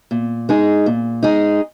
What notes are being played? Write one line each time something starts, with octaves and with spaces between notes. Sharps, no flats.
A#2
G#3 D#4 G#4
A#2
G#3 D#4 G#4